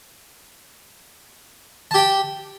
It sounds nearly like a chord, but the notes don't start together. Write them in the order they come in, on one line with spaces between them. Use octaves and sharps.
A5 G4 G5